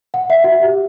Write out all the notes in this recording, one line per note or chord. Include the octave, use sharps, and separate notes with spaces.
F#5
E5
F#4
G4